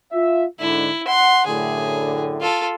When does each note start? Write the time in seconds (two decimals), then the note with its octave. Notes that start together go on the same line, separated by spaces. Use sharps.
0.12 F4 E5
0.59 G#2 D3 E4
1.07 F#5 C6
1.46 F#2 A2 D3 G#4
2.41 F4 A4